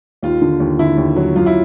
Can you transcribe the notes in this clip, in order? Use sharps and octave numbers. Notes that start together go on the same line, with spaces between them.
D#2 F4
D3
D#2
D3 E4
D#2
F#3
F#2 F4
E4